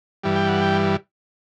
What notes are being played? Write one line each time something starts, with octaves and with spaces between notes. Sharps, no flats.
G2 E3 G3
G5
F#5
G5